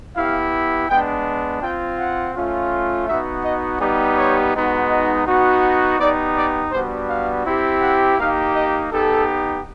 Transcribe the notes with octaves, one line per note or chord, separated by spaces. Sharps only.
B3 E4 G4 F5
G#3 B3 D4 G5
C4 F4 G5
F#5
A3 C#4 F4
B3 D#4 F#4 E5
D#5
G3 B3 D#4 G4 D5
C#5
G#3 B3 D#4 F#4
D#5
B3 D#4 F#4
B3 D#4 G4 D5
D5
G3 B3 D4 F#4 C5
F5
C4 E4 G4
F#5
A#3 D#4 G4 F5
D#5
B3 D#4 G4 A4